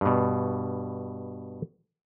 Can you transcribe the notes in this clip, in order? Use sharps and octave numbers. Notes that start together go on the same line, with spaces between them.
G2 B2